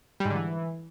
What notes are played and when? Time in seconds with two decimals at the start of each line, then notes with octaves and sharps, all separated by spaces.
0.20 G3
0.25 G#2
0.30 D3
0.35 E3